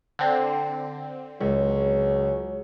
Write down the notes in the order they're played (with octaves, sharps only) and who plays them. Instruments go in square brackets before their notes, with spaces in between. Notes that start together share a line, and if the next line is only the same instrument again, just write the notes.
[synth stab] D3 C4
[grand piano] C#2 [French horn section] F#3 G#4 C#5